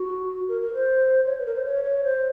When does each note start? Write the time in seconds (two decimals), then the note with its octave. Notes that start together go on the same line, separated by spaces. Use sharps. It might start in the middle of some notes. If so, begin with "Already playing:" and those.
Already playing: F#4
0.48 A#4
0.61 A#4
0.74 C5
1.26 C#5
1.39 B4
1.46 A#4
1.55 C5
1.65 C#5
1.84 C#5
2.04 C5